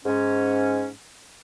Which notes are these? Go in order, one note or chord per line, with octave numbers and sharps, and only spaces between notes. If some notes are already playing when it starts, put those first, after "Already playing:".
G#2 C#4